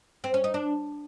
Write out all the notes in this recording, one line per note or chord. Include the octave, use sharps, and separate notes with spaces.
C4
C#4
D#4
D4